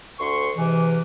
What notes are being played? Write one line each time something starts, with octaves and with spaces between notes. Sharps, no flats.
D2 C6 C#6
G#2 C3 E3